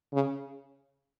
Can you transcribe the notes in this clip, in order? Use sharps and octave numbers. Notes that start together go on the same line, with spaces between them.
C#3